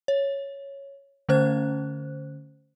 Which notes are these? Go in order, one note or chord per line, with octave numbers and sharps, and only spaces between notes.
C#5
D3 A3 C#4 C5 F#6